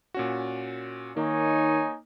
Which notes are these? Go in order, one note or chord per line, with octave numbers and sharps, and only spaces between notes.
A#2 C#4 F#4
D#3 A#3 D#4 C#5 G#5